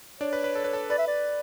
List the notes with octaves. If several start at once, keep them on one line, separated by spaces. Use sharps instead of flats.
D4 C#5 D5
B4
B4
A4
B4
A4
B4 D5
E5
D5